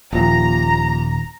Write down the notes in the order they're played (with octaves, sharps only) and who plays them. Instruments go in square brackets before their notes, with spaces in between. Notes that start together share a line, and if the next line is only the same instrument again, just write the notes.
[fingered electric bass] D#1 [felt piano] A#2 F3 [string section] A#5